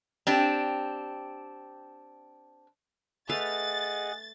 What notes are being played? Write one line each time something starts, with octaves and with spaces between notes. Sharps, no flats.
C4 D4 G4
A3 G#4 B4 D#5 F5 F#5 A6